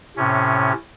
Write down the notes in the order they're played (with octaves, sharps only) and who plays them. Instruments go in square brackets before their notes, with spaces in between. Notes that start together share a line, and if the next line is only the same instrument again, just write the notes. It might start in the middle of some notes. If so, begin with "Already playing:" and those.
[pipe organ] A2 C3 C#4